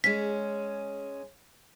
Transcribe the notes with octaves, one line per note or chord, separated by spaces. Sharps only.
G#3 C#4 B6